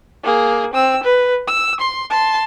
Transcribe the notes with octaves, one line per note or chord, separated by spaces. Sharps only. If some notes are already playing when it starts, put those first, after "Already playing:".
A#3 G#4
C4 E6
B4
E6
C6
A5 C6